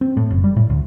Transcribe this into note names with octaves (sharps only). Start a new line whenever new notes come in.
C4
A2
F#1
G3
A2
D2